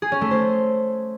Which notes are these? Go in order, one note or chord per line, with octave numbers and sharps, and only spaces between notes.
G#4
C#4
A3
C5